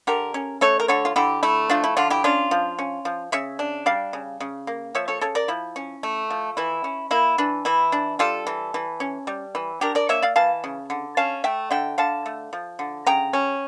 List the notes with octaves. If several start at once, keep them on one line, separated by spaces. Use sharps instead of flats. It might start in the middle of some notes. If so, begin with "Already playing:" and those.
D3 G4 A#4
C#4
A3 A4 C#5
A#4
D3 A4 C#5
F4
D3 E4 G4
A3 E4
F3 D4 F4
E4
D3 D4 F4
E4 G4
C#4 D4 F4
F3
C#4
F3
C#3 C#5 E5
D4
G3 D5 F5
C#3
C#3
A#3
F3 C#5 E5
A4 C#5
C#3 A4 C#5
A#4 D5
F3 E4
C#4
A3
F3
E3 E4
C#4
A#3 E4
E3 D4
E3 E4
D4
G3 F4 A4
E3
E3
C#4
G3
E3
D4 G4 A#4
A#4 D5
A#3 C#5 E5
D5 F5
E3 F5 A5
C#3
D3
C#4 F5 A5
A3 E5 G5
D3 E5 G5
D3 F5 A5
A3
F3
D3
C#3 G5 A#5
C#4